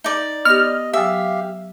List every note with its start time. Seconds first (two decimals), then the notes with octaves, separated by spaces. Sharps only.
0.04 D#4 D5
0.45 B3 G4 D#5 F6
0.93 F#3 G4 E5 F5 G#5 D#6